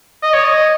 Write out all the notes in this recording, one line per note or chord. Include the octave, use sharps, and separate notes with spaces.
D#5
C#5
D#5